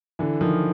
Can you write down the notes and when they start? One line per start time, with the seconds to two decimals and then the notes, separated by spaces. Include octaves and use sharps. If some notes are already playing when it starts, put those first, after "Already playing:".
0.19 D3 E3
0.41 D#3 F3